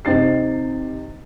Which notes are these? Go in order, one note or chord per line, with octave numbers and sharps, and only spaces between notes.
C3 C4 D#4 A6 C7